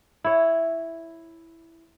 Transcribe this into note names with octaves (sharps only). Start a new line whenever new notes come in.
E4 C#5